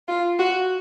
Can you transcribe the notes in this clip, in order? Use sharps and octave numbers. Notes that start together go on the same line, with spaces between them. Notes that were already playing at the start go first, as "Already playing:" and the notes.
F4
F#4